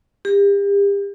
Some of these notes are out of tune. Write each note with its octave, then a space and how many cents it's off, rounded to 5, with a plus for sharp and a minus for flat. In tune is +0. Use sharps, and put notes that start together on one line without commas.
G4 +40